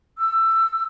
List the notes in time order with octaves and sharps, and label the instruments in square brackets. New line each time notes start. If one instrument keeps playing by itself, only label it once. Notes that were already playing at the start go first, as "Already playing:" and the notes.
[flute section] E6